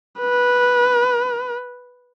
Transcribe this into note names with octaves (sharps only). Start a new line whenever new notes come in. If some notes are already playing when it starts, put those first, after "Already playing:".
B4